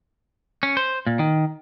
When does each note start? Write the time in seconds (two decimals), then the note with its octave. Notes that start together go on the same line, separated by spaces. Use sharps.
0.63 C#4
0.77 C5
1.07 A#2
1.19 D#3